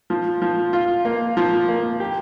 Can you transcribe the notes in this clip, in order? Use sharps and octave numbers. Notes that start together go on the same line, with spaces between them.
F3
F3
F4
A#3
F3
A#3
G4